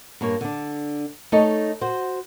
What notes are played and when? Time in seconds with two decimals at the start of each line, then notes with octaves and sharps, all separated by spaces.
0.21 G2 A#3 C#5
0.41 D3 D4
1.32 A3 D#4 A4 C#5 D#5
1.81 F#4 C5